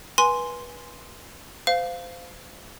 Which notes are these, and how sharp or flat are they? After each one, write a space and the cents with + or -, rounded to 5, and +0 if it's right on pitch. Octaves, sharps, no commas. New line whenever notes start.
B4 -25 G#5 +0 C6 +0
C5 -30 F5 +0